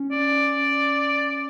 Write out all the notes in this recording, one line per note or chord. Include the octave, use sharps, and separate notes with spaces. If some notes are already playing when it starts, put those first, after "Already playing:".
Already playing: C#4
D5